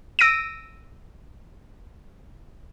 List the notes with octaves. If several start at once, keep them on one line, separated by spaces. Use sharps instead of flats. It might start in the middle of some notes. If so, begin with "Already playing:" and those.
E6 A#6 D7 D#7